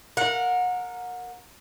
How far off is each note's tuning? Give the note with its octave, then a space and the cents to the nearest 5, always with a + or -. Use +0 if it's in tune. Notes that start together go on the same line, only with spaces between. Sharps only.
A#4 -5 F#5 -30